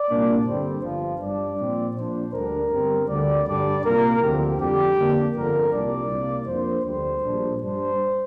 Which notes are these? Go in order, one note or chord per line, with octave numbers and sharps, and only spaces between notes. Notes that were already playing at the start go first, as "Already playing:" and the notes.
Already playing: D5
C2 A#2 A#3 D4
G2 D3 G3 C4 C5
G1 G2 F3
G2 G3 D4 D5
A#2 F3 C4
A#2 F3 D4 C5
D2 D3 G3 D4 A#4
G1 G2 G3 C4
D2 D3 G3 D5
G2 D3 G3 D4 D5
C2 A#2 A#3 A#4
D2 D3 F3 C4 G4
F2 D3 G3 G4
F2 D3 A#3 D4
G1 F2 D3 A#4
C2 A#2 G3 D4 D5
C2 C3 A#3
F2 F3 A#3 D4 C5
D2 D3 G3 C5
A#1 A#2 G3 D4
G2 G3 D4 C5